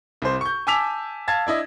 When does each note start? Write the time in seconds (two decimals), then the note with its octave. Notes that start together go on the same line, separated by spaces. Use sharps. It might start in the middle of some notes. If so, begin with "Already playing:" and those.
0.22 C2 C5
0.41 C#6 G6
0.67 G#5 A5 D6 E6 B6 F7
1.28 F5 A5 G#6 A6
1.47 D4 E4 D#5